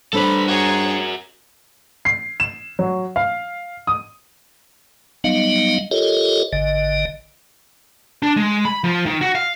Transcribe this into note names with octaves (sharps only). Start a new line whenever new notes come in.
G3 D4 A4 B4 C5 B5
F#4 G#4 A#4 C#5
C7
E7
F#3
F5
D#6
F#3 G3 B3 D#4 D#5 F5
F4 G4 A4 A#4 C#5 D#5
G#1 D3 D#5
D4
G#3
B5
F3
D#3
F#4
F5